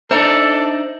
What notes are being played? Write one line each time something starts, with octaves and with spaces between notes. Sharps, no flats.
D4 D#4 A4 C5 E5 A#5